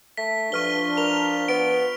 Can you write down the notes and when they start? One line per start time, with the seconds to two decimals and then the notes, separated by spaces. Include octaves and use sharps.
0.17 A3 B6
0.52 G2 F3 D4 C#6 F6 G7
0.97 A#4 F7 G7
1.48 B3 D7